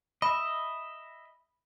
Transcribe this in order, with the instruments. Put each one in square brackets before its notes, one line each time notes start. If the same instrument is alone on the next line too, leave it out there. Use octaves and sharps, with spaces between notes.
[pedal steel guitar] D#5 E5 [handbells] B5